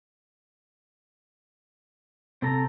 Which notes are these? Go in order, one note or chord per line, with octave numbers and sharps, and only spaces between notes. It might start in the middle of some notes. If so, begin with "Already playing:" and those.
C3 C4 A4 A#5